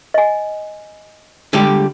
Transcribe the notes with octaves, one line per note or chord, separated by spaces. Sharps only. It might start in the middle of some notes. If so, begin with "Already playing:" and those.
D#5 G#5
D3 G3 G#3 G4